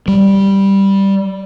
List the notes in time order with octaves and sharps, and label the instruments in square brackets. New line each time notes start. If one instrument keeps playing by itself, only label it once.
[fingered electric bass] G3